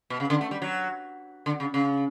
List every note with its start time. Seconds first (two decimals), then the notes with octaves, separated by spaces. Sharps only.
0.10 B2
0.20 C#3
0.30 D3
0.41 A3
0.51 G3
0.62 F#3
1.46 D3
1.60 C#3
1.74 C#3